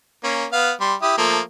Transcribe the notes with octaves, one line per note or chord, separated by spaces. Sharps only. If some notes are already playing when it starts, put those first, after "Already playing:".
A#3 C#4
B3 F5
G3 C6
E4 G4 D#6
F3 A3 A#3